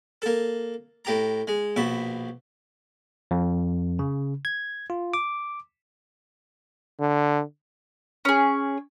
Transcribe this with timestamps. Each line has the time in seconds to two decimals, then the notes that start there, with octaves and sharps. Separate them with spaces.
0.22 A#3 A4
1.05 A2 G4 A#5
1.48 G#3
1.76 A#1 B2 E5
3.31 F2
3.99 C#3
4.45 G#6
4.90 F4
5.14 D6
7.00 D3
8.25 C#4 G#4